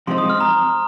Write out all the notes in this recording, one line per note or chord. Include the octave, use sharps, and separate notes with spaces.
C3 F3 G#3 C4 D#4 C6
D#6
F6
A#5